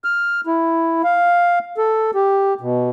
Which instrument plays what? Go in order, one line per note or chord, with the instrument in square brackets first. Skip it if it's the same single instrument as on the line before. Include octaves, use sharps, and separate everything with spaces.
[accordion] F6
E4
F5
A4
G4
B2